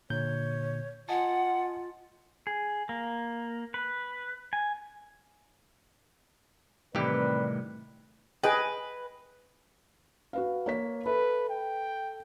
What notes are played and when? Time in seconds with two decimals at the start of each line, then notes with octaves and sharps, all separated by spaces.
0.10 A#2 D3 C#5 G6
1.09 F4 D#5 F#5 G#5 A5
2.47 G#4
2.89 A#3
3.74 B4
4.53 G#5
6.95 C2 A2 D#3 E3 C4 G4 B4 D5
8.44 G#4 B4 D#5 G5
10.33 F#4 B4 F5
10.66 A#3 C#5 B6
11.06 A4 B4 E5
11.49 G5